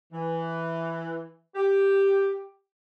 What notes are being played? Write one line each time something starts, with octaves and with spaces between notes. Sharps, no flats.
E3
G4